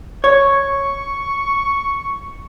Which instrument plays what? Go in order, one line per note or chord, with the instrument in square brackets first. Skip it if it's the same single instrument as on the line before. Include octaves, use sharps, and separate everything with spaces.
[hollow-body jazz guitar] C#5 [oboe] C#6